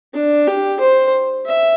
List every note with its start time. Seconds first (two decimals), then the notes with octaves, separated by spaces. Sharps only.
0.14 D4
0.47 G4
0.80 C5
1.46 E5